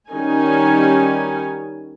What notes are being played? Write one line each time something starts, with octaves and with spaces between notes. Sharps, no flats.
D#3 G3 C#4 D#4 G#5